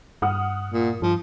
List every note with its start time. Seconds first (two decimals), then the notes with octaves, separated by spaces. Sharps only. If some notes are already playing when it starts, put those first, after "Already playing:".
0.22 G2 F#5 D#6 F6
0.70 A#2
1.02 G2 F3